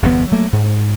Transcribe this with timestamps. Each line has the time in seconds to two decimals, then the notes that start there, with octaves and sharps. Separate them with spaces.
0.02 G1 E2 C3 B3
0.31 F#3 A3 A#3
0.53 G#2